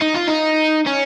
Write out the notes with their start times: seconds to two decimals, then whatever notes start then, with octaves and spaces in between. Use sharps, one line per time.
0.02 D#4
0.15 F4
0.28 D#4
0.86 C#4